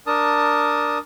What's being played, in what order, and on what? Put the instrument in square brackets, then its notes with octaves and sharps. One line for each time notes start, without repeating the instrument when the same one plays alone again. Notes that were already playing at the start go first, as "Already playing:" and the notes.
[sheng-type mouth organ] D4 A#4 A5 D#6